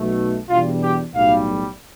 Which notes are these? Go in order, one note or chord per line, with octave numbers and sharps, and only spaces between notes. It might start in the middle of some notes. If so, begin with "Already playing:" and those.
Already playing: B1 B2 A3
E2 B2 G3 D4 F4
G4
B1 A2 G3 F5